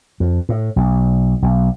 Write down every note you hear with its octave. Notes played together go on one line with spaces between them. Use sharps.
F2
A2
B1
B1